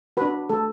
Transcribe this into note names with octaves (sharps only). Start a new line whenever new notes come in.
D4 F#4 B4
A3 A4